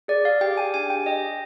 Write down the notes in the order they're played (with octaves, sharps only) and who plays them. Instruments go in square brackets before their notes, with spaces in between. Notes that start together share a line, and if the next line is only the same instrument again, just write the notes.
[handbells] G#4 D5
F5
G4 G5
G#5
D4 G#5
G5
G4 D#5